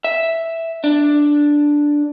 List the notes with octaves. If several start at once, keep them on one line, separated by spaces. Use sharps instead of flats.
E5
D4